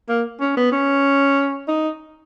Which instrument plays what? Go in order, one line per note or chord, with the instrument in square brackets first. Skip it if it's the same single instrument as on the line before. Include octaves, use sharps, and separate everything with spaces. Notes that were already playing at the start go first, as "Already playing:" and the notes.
[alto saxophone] A#3
C#4
B3
C#4
D#4